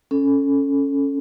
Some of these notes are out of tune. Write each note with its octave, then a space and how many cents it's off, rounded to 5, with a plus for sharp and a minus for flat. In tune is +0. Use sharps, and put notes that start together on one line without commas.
C#4 +0 A4 +0